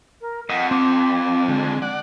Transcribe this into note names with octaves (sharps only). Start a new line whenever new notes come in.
A#4
F2 D#5 F#5
C4 D6
D3 G#3
D5 F#5 F#6